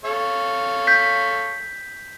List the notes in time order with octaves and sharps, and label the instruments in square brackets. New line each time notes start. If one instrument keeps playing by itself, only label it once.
[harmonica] A4 C#5 F5
[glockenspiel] G6 B6